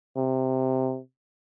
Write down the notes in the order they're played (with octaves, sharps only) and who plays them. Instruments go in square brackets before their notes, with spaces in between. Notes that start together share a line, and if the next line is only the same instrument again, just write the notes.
[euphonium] C3